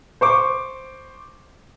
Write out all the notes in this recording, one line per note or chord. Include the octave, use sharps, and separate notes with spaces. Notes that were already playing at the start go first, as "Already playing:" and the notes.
C5 C#6 D6